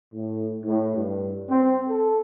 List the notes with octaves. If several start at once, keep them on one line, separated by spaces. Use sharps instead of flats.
A2
A2
G2
C4
A4